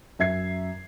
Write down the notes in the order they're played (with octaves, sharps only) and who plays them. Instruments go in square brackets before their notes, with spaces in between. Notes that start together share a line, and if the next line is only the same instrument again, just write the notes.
[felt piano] F#2 E5 G#6 C7